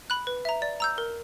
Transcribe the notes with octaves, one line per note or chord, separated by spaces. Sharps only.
B5 F#6
B4
E5 A#5
D5
A#5 E6 G6
A#4